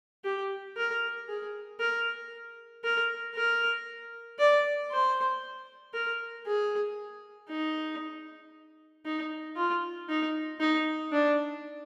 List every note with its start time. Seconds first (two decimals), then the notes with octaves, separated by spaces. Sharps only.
0.24 G4
0.77 A#4
1.28 G#4
1.79 A#4
2.84 A#4
3.35 A#4
4.39 D5
4.91 C5
5.94 A#4
6.46 G#4
7.49 D#4
9.05 D#4
9.57 F4
10.09 D#4
10.60 D#4
11.12 D4